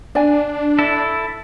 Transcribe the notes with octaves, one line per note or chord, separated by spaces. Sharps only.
D4 D5 G#5
E4 A4